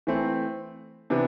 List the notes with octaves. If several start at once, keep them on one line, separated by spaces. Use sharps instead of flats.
E3 A3 C4
C3 E3 B3 D4